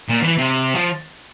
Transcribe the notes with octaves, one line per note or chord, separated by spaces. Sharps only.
A#2
E3
C3
F3